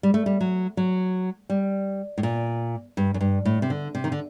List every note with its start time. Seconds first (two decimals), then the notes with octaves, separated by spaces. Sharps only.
0.03 G3
0.14 A3
0.26 G3
0.40 F#3
0.77 F#3
1.50 G3
2.18 A2
2.23 A#2
2.97 G2
3.14 F#2
3.21 G2
3.45 A2
3.62 C3
3.70 D3
3.95 C3
4.04 D#3
4.12 D3